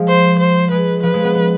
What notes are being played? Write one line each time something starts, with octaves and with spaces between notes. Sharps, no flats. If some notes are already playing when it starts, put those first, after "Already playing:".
Already playing: F3 G#3
C5
C5
G#3 B4
F3 B4
G#3
B3
B3